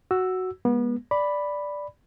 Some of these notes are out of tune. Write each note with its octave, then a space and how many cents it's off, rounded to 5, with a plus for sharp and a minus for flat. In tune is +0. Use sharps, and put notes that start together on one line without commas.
F#4 +0 E6 +0
G#3 -15 B3 -30
D5 +0 B5 +0